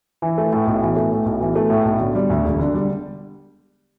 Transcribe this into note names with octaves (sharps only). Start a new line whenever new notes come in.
E3
A3
A2
B1
E3
A3
A2
B1
E3
A3
A2
B1
D3
G3
D2
E1
D3
G3